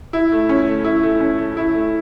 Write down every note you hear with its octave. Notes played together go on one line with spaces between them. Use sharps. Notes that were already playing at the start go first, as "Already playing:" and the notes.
E4
A3
C#4
A3
E4
A3
C#4
A3
E4
A3